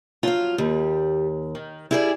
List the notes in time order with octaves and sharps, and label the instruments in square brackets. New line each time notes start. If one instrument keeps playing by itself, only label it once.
[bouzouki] F3 F#3 [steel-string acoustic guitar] F4 F5
[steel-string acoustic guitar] D#2 [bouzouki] G3
[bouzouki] D#3
[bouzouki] G3 [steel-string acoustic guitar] E4 G#4 D5